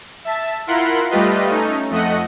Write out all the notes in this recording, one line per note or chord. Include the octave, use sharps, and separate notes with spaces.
E5 A5
E4 F4 A#4 F#5 B5 C6
G3 A3 F4 G4 B4 D#5
A3 C#4 D#4
F2 A3 D#5 F#5